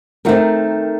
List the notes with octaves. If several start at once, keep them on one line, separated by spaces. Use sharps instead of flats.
D#3 A3 C4 D#4 F#4 A#4